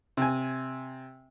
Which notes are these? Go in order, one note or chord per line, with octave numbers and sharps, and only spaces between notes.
C3 G#5